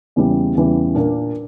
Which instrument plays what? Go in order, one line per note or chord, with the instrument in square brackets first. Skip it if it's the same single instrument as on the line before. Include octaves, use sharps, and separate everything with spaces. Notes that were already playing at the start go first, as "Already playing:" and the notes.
[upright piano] E2 C#3 E3 G3
E2 C#3 E3 G3
A#2 A#3 D4